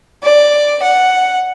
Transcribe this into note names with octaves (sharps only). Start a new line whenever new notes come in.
D5
F#5